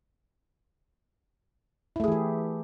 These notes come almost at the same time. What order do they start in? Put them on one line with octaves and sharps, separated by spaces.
E4 A3 G#4 E3 G4